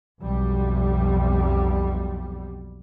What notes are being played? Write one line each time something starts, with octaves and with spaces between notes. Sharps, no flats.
B1 F2 G3